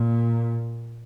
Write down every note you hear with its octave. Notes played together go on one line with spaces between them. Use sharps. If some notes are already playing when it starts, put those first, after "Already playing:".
Already playing: A#2